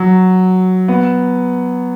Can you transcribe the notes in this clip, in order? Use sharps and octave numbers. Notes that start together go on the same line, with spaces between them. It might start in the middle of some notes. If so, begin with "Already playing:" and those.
Already playing: F#3
B3